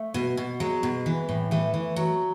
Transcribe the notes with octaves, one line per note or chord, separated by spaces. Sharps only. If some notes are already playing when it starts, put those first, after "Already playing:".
Already playing: A3
B2
B2
F#3 G#3
B2
E3
A2
E3 A3
E3
F#3